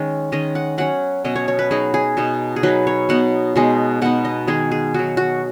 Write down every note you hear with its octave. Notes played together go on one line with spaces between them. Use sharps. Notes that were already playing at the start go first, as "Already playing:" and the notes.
Already playing: D#3 G#3 C#4 D#4
D#3 G#3 C#4 D#5
F#5
F#3 C#4 F#5
B2 F#3 C#4 D#5
C#5
C#5
B4
F#3 D#4 G#4
G#4
B2 B3 D#4
G#4
F#3 D#4 B4
C#5
B2 B3 D#4 F#5
B2 G#3 D#4
B2 B3 D#4 F#5
D#5
D#3 G#3 D#4 G#4
G#4
F#3 D#4 F#4
F#4